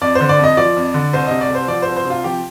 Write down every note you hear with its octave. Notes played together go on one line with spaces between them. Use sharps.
F2 D5
D3 C5
D5
F2 D#5
F3 D5
F2
D3
C2 C5
C3 D#5
D5
C2
C5
F3 D5
C5
C2
C5
C3 F4
F3 G4